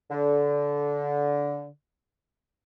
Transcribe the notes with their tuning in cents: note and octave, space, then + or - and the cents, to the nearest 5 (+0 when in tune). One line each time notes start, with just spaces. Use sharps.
D3 -20